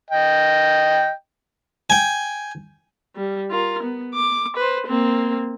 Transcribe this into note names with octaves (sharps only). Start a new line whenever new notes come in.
D#5 G5
G5 G#5
G3
F4 A#4
B3
D6
B4 C5
A#3 C4